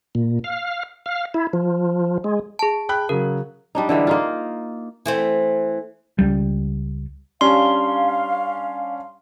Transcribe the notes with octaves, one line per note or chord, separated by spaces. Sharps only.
A#2
F5
F5
E4
F3
G#3
G#4 A5
G5 B5 F#6
C#3 F#3 A#4
G3 D4 D#4
D3 E3 G3 G#3
A#3 D#4 F4
E3 A3 C4
C#2 G3
G3 C#4 D4 F5 C6